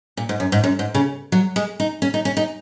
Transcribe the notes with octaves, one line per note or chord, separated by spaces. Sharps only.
A#2
G#2
F#2
G#2
F#2
G#2
C#3
F#3
G#3
D#4
C#4
D#4
C#4
D#4